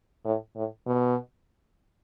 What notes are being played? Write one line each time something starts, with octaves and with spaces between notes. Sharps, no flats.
A2
A2
B2